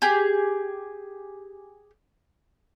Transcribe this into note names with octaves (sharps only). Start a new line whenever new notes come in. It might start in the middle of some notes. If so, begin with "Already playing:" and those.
G4 G#4